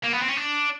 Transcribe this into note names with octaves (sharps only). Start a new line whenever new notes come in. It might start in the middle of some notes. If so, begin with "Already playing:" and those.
A#3
B3
C4
C#4
D4